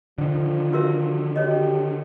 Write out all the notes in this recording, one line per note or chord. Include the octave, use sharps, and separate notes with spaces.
D3 D#3 F3
F#4 A#4 E5
D4 F#4 G4 C#5 D#5